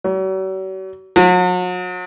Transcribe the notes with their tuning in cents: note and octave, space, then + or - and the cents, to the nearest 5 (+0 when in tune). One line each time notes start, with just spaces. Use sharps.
F#3 +45
F#3 -40